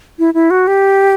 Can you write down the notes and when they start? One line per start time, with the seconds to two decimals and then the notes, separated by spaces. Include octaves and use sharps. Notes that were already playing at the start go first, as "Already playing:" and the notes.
0.19 E4
0.34 E4
0.50 F#4
0.67 G4